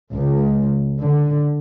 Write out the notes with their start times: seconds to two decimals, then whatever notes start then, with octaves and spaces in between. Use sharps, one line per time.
0.13 C#2
1.01 D3